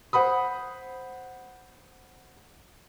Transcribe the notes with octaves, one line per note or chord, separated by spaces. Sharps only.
C5 F#5 B5 D#6